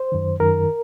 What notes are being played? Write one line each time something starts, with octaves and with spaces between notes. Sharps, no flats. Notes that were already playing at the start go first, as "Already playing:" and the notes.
Already playing: C5
F#2 D#3
F#2 D#3 A#4